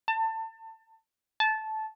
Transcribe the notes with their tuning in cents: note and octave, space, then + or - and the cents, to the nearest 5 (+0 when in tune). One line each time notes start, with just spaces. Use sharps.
A5 +25
A5 -15